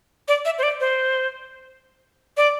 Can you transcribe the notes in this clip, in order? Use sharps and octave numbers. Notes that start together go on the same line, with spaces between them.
D5
E5
C5
D5
C5
D5